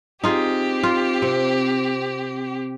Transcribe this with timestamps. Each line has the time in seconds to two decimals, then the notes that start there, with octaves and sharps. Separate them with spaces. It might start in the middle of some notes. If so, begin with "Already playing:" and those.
0.24 C4 D#4 F4 G4 G#4
0.83 F4
1.22 C3